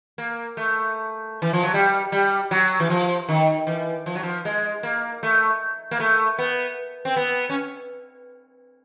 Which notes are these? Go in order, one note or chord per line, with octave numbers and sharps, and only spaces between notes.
A#3
A3
E3
F3
F#3
G3
G3
F#3
E3
F3
D#3
E3
F3
F#3
F3
G#3
A#3
A3
A#3
A3
B3
C4
B3
C#4